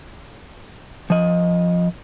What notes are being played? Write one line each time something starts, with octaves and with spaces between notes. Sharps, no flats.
F3 D#5